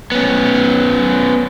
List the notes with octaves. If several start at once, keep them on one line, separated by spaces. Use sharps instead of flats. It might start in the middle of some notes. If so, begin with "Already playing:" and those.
B3 C#4